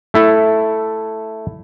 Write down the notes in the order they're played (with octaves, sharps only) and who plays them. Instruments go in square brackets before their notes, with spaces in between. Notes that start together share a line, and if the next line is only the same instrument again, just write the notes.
[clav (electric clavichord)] A3 E4 A4